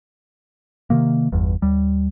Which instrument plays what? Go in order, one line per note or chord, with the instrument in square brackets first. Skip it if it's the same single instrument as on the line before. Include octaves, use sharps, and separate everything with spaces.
[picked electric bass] C3 D#3 A#3
G1 E2 G2
D#2 G3